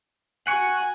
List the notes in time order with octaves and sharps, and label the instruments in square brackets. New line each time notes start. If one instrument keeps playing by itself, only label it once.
[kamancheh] F#4 G#5 [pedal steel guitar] F#5 C#6